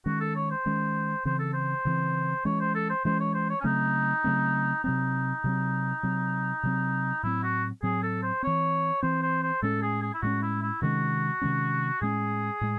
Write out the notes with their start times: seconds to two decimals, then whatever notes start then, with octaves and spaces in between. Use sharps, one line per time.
0.06 D#3 G#3 C#4 F#4
0.20 A4
0.35 C#5
0.50 C5
0.66 D#3 G#3 C#4
1.25 C#3 E3 C4 C5
1.39 A4
1.53 C5
1.85 C#3 E3 C4
2.45 E3 G#3 C#4 C#5
2.60 C5
2.75 A4
2.90 C5
3.05 E3 G#3 C#4 C5
3.20 C#5
3.34 C5
3.49 C#5
3.60 C#4
3.64 C#3 F#3 A3 C4 D#4
4.24 C#3 F#3 A3 C4
4.84 C3 F#3 C4 D#4
5.44 C3 F#3 C4
6.03 C3 F#3 C4
6.63 C3 F#3 C4
7.23 A2 F#3 C4 E4
7.43 F#4
7.83 A2 F#3 C4 G#4
8.03 A4
8.22 C5
8.43 E3 C4 C#5
9.02 E3 C4 C5
9.22 C5
9.43 C5
9.62 A2 G#3 C#4 A4
9.82 G#4
10.02 G#4
10.14 E4
10.22 A2 G#3 C#4 F#4
10.42 E4
10.62 E4
10.82 C3 D#3 G#3 C#4 F#4
11.41 C3 D#3 G#3 C#4
12.01 A2 G#3 C#4 G#4
12.61 A2 G#3